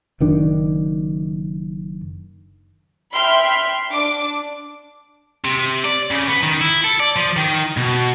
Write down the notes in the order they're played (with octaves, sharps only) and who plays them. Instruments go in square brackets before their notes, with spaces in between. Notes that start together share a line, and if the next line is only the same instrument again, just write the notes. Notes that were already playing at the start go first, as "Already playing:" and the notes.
[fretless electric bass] F#1 D#3 D4
[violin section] E5 G5 B5 C6 F6
D4 D6
[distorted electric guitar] C3
D5
C#3
B3
D#3
E4
A4
D5
F3
D#3
B2